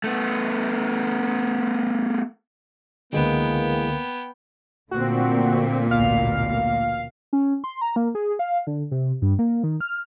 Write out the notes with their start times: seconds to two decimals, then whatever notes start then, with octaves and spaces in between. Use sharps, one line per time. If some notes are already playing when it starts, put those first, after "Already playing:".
0.04 A3 B3
3.13 C#2 D3 E3 G#3 A#3 B3 G5
4.91 A#2 D3 A3 C4 F#4
5.91 A1 D2 B2 F5
7.33 C#4
7.64 C6
7.81 A#5
7.96 A#3
8.15 G#4
8.39 F5
8.67 D3
8.91 C3
9.22 G2
9.39 A#3
9.64 D#3
9.81 F6